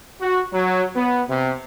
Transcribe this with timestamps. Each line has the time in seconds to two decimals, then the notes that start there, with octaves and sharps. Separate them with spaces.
0.21 F#4
0.53 F#3
0.96 B3
1.29 C3